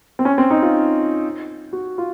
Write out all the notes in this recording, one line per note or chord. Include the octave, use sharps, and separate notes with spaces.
C4
C#4
C4
D#4
F4
F#4
F4